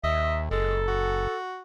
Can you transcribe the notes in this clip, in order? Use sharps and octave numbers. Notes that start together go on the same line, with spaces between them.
D#2 D#5 E5
F#1 G#3 A4
F#4